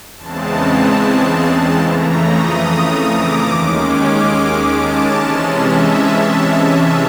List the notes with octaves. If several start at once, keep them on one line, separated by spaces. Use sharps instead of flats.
E2 C#3 E3 G#3 C4 A5
F2 C#3 E3 A3 A#5
D#6
D#6
D6
D#2 D#3 G#3 C#4
D6
A5
C3 E3 G#3 C#4
E5